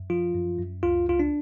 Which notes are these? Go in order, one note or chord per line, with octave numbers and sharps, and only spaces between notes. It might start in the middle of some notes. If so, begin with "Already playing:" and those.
Already playing: F#2
F3 F4
F#2
F#2
C#2 F4
C#2 F4
D4